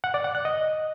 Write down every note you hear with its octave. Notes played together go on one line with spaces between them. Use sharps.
F#5
D5
F#5
F#6
D#5